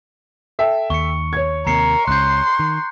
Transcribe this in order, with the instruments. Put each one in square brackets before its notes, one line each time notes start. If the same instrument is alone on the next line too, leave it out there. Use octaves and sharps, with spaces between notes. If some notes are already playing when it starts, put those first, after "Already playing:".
[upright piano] A4 E5 G5
[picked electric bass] D#2 [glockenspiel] C#6 C#7
[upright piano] C#5 G#6
[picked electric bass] D#2 C3 [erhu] A#4 [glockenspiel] A#5 C7 C#7
[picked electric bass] C#2 C#3 [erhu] C6 [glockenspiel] F#6 G6
[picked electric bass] D#3